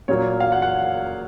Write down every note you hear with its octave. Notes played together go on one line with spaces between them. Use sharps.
A#2 F#3 A#3 C#5
F5
F#5
F#5